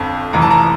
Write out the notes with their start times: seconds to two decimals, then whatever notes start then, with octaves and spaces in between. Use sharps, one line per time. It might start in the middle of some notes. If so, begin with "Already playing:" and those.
Already playing: G1 F2 D3 A5
0.33 F1 F2 E3 A#5
0.42 A5
0.51 A#5